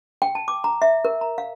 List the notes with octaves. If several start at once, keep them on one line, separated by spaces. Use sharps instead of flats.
G5
A5
D6
A#5
E5
A#4
A#5
F5